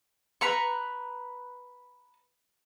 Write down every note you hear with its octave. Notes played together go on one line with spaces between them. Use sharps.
B4 A#5 B5 C#6